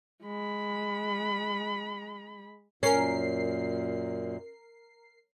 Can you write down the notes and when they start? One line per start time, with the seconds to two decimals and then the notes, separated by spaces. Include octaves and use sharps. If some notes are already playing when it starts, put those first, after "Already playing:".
0.23 G#3 B5
2.83 F#2 A#2 C#4 A#4 C7